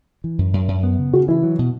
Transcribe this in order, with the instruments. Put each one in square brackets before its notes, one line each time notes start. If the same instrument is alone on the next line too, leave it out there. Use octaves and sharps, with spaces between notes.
[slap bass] E3
F#2
F#2
F#2
B3
C#3
[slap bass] C#3 [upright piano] F#4
[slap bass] E3 [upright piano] E4
[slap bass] F#3
B2